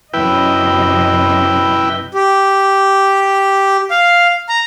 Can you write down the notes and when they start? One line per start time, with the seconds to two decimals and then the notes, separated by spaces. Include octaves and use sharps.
0.14 F#2 C3 E4 B4 D#5 G5
2.14 G4
3.91 F5
4.49 A#5